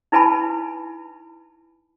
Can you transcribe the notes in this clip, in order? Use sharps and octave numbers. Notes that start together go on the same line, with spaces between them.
D#4 E4 B4 G#5 A5 B5